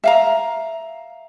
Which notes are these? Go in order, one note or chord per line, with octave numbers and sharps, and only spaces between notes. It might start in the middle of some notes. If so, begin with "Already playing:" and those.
E5 F5 A#5